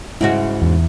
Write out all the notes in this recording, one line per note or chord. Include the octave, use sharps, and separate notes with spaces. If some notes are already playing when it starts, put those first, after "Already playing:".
G#2 C#3 E4 F#4
E2